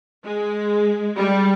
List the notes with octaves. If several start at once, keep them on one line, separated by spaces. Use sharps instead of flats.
G#3
G3